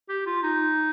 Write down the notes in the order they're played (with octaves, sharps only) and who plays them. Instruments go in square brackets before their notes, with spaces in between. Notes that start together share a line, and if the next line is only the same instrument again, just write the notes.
[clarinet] G4
F4
D#4